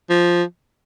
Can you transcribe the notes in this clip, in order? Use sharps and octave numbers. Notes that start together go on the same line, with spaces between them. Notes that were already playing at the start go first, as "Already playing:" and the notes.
F3